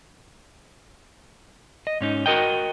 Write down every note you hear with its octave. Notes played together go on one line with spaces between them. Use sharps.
D#5
G#2 C#4 D#4
F#4 A#4 D#5 G5